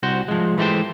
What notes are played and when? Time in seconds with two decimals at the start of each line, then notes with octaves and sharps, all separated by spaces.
0.03 C2 F#4 C5
0.28 F3 G#3
0.58 E3 G#3 A3 F#4 G4 C5